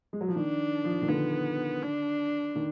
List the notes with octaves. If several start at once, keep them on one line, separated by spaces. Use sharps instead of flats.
G#3
F#3
F3
D#3 D4
F3
D#3
D3 B3
D4
D#3